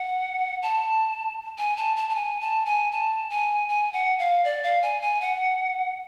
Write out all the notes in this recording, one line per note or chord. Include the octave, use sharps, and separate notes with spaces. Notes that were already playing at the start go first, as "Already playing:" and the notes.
Already playing: F#5
A5
G#5
A5
A5
A5
G#5
A5
G#5
A5
G#5
G#5
F#5
F5
D5
F5
G#5
G#5
F#5